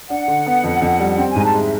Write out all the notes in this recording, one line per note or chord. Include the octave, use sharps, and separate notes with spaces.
D4 F#5
D3
B3
F2
F2
G3
C4 G5
G#2 G#5
A5
G#3 E5